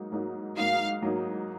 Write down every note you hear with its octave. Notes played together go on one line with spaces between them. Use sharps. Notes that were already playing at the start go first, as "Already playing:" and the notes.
Already playing: G#2 F#3 A#3 D#4
G#2 F#3 A#3 D#4
G#2 F#3 A#3 D#4 F5
G#2 F#3 A#3 D#4